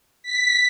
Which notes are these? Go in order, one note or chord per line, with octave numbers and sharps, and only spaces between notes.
B6